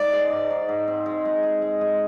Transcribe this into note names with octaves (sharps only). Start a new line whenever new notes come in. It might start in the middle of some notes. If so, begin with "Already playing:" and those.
Already playing: G#2 D5
G#3
G#2
G#2
G#2
C4
G#3
G#3
G#3
G#3
G#3